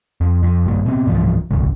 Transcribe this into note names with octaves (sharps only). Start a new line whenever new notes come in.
F2
F2
A#1 G2 A#3
B2 C4
C#2 G#2 E3 F3
D#1 G#1 C#2